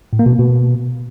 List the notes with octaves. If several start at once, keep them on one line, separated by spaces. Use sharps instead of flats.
A2
A#3
B2
A#3
B2